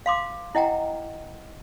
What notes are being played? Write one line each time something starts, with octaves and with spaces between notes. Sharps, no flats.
F5 C6 D6
E4 D#5 F#5 G5 A#5